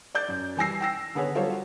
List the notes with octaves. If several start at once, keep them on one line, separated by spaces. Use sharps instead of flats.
D5 G6
F#2
E3 G3 G#5 E6 A#6 C7
G5 E6 A#6
D3 B3 G#4 B4 C#5
F#3 G3 F4 A4 C5 C#5